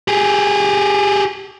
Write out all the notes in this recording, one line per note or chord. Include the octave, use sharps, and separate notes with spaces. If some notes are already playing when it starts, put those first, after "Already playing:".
G4 G#4